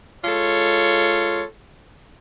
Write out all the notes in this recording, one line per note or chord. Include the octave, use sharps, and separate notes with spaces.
G#3 F4 A4 C#5